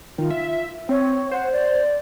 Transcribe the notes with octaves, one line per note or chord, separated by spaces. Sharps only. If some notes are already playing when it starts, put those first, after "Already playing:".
D#3 F4
E5
C4 C#5
C5 F#5
D5